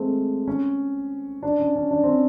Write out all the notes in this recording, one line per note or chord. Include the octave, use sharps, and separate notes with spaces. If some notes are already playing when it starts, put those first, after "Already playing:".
Already playing: G#3 A3 C4
C#4
D4
C#4
C#4
D4
C4
C#4